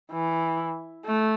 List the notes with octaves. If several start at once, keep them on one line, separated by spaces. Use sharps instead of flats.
E3
A3